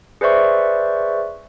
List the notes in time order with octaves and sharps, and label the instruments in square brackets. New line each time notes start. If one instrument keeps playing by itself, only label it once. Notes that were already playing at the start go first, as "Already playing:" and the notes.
[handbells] G#4 B4 C5 D5 E5 C#6